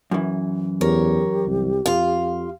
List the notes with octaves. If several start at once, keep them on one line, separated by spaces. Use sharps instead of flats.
F#2 E3
E2 G4 A#4 C#5
C2
F2 F4 F5